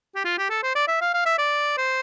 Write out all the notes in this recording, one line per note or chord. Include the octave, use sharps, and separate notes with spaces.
G4
F4
G4
A4
C5
D5
E5
F5
F5
E5
D5
C5